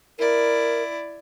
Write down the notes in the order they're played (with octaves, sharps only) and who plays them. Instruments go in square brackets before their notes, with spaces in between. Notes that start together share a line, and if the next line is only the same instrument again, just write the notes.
[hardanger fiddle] E4 D5 [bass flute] A#4